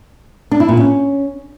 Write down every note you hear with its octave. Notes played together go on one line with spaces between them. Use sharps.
D4
E4
A#2
C#4